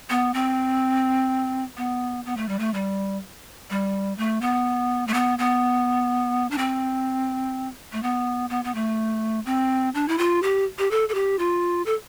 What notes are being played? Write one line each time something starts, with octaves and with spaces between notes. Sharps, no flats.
B3
C4
B3
B3
A3
G3
A3
G3
G3
A3
B3
A3
B3
B3
D4
C4
A3
B3
B3
B3
A3
C4
D4
E4
F4
G4
G4
A4
A4
G4
F4
A4